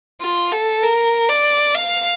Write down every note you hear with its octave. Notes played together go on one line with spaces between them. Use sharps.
F4
A4
A#4
D5
F5